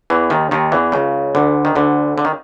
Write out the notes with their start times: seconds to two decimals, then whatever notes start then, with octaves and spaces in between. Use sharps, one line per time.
0.10 E2 E3
0.30 D#2 D#3
0.51 D#2 D#3
0.72 E2 E3
0.92 C#2 C#3
1.35 D2 D3
1.65 D#3
1.75 D2 D3
2.18 D3
2.25 D#3